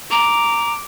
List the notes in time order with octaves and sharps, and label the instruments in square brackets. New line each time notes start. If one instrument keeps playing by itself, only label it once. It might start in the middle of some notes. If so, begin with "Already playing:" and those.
[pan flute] A#5 [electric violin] D6